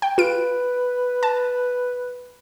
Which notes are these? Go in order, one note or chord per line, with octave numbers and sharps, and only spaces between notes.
G5
F4 B4 D7
A5